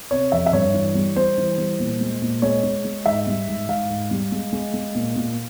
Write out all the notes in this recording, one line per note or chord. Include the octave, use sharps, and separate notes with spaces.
C3 C#5
F2 E5
E5
G2 C#5
E3
G3
G3 C5
E3
G3
A#2
G#3
A#2
G#3 C#5
G#3
G#3
G#2 E5
G3
G#2
G#2 F5
G#2
G3
G#3
G#3
G#3
A#2
A#2